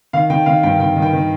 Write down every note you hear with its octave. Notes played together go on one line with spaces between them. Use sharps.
D#3 F5
D#3 G5
D#3 F5
G2 G5
D#3 G5
D#3
G5
D#3